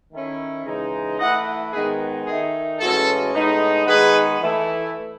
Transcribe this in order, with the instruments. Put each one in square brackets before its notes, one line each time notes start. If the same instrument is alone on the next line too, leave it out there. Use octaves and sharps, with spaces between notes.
[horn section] D#3 A3 C#4 E4
C#3 E3 G#3 D#4
E3 A3 E4 D#5 F#5
G#2 D#3 G#3 B3 D#4 G#4 B4
D#3 A3 D#4 G#4
A2 E3 G#3 C#4 F#4 A4
A2 G#3 B3 D#4
D#3 G#3 B3 D#4 G#4 B4
E3 A3 E4